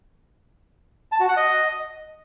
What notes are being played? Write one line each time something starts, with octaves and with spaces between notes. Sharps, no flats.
A5
F#4
F#5
D#5